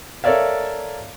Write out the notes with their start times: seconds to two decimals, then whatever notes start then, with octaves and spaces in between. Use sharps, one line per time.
0.24 A4 A#4 C#5 D5 E5 F5